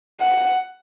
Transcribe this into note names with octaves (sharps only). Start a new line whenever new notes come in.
F#5